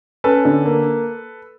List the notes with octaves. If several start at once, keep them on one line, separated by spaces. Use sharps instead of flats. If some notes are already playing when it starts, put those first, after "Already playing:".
C#4 A4 B4
D3
A#3